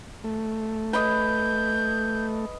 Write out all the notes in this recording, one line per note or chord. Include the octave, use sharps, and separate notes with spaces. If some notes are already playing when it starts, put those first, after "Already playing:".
A3
B4 D#5 G6